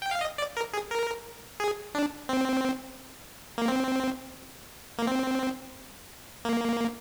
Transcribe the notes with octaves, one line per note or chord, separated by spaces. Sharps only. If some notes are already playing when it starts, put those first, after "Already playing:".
G5
F5
D#5
D5
A#4
G#4
A#4
G#4
D4
C4
A#3
C4
A#3
C4
A#3